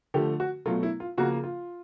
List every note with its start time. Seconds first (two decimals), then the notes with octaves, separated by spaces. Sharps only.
0.14 D3 F3 A3 G4
0.40 F#4
0.66 B2 F#3 A3 F4
0.83 E4
1.00 F4
1.18 C#3 F3 A#3 F#4
1.44 F4